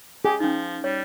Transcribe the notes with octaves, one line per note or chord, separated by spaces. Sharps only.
G4 G#4
F3 C#4 D#4
G3 C#5